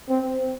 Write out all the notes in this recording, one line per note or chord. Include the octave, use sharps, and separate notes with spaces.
C4